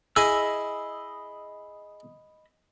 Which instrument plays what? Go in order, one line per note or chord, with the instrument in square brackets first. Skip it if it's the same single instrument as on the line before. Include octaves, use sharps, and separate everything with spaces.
[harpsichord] E4 G#4 G#5 [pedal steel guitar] D#5 B5 E6